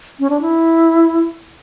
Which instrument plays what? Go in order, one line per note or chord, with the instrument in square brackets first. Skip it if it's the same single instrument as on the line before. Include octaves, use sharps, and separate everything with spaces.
[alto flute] C#4
D4
E4